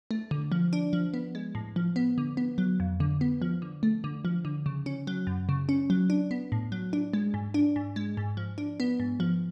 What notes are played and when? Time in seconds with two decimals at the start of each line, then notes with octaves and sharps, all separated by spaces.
0.11 A3
0.31 D3
0.52 F3
0.73 D4
0.93 F3
1.14 B3
1.35 G#3
1.55 A2
1.76 F3
1.96 B3
2.18 D3
2.37 B3
2.58 F#3
2.80 F2
3.00 D3
3.21 B3
3.42 F3
3.62 D3
3.83 A3
4.04 D3
4.25 F3
4.45 D3
4.66 C#3
4.86 C#4
5.07 F#3
5.27 F#2
5.49 C#3
5.69 C#4
5.90 F#3
6.10 D4
6.31 B3
6.52 A2
6.72 F#3
6.93 D4
7.14 G#3
7.34 G#2
7.54 D4
7.76 G#2
7.96 G#3
8.17 G#2
8.37 F3
8.58 D4
8.80 B3
9.00 G#2
9.20 F3